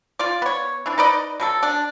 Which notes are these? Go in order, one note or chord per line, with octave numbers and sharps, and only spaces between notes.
F4 D5
B3 C#5
E3 D4
D#4 B4 D5 D#5
B2 F#3 A4
D4